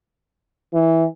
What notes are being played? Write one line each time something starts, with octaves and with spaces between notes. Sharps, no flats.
E3